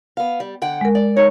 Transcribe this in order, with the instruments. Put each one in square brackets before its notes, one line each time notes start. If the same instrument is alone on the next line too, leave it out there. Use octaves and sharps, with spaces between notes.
[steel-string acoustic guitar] B3 F5
G3
D3 F#5 G5
[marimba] G#3 A#4
[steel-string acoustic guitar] D5
[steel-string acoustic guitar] D#4 [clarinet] C#5